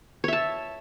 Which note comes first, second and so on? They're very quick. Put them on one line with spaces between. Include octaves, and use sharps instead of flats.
C#5 E5 A5